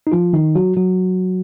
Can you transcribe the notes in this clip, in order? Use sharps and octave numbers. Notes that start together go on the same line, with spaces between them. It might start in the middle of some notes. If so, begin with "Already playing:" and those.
D#4
F3 F4
D#3 D#4
F#3 F#4
F#3 F#4